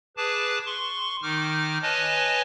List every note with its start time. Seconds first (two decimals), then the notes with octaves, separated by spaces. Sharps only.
0.17 G#4 B4 A5 D6
0.66 C6 C#6
1.22 D#3 D#4 D6 F6
1.82 B4 C#5 D#5 G#5 A5